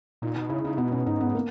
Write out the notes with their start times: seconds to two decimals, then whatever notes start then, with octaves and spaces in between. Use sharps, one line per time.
0.22 A#2 D#4
0.36 B2 D#4
0.50 C#3 E4
0.64 C#3 D#4
0.78 B2 B3
0.92 C#4
1.06 G#2 D#4
1.20 B3
1.35 A#3